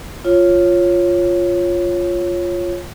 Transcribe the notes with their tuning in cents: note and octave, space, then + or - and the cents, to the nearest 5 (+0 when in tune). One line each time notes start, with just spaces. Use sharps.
F4 +0 C#5 -10